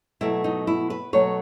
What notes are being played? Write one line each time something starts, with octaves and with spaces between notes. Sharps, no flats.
B2 F#3 A3 E4
D#4
E4
B4
B2 F#3 A3 C#5